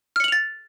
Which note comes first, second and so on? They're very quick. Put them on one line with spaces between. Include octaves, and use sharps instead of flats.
F6 C#7 F#7 F7 A6